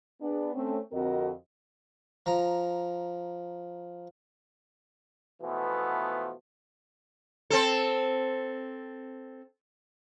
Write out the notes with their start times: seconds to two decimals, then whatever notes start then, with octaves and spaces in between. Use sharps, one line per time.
0.21 B3 D4 G#4
0.54 A3 C4 C#4
0.92 F2 D3 C4 F#4 A#4 D#5
2.26 F3 A#5
5.42 B2 E3 F3 A3 B3
7.50 C4 A4